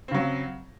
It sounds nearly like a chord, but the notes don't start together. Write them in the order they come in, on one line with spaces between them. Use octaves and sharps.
C4 C#3 F#3